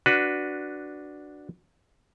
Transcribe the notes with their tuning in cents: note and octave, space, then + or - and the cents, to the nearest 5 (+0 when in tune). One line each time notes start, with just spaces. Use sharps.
D4 +0 F#4 +0 B4 +0